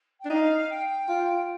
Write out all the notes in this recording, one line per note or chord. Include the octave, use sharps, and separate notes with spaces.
G5
D4
D#4 F5
G5
F4